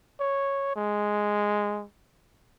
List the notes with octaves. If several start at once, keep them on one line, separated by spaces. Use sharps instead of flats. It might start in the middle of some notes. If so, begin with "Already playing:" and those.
C#5
G#3